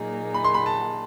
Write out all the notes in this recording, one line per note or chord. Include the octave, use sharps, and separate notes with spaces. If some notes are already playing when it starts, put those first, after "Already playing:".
Already playing: A#2 F#3 A#3 D#4 G#4
B5
C6
B5
A5